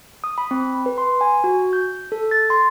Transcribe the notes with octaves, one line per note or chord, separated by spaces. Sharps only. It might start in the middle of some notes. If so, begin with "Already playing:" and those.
D#6
B5
C4
B4
C6
G#5
F#4
G6
A4
A6
C6